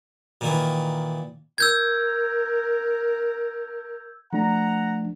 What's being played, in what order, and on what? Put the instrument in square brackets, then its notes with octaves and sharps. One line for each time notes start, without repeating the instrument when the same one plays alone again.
[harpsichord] A#2 D#3 E3
[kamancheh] A#4 [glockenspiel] E6 G6 G#6
[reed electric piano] F3 A3 D4 [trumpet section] F#5 A#5